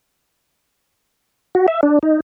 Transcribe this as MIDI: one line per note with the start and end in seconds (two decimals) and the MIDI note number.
1.55 1.66 66
1.68 1.81 76
1.83 1.99 62
2.03 2.20 63